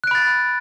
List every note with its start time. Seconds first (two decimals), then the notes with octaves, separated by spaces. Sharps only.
0.04 F#6
0.07 D7
0.11 B5
0.15 A6